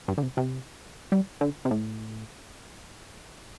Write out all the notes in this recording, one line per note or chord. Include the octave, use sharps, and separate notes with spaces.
G2
D3
C3
C3
G3
D3
C3
A2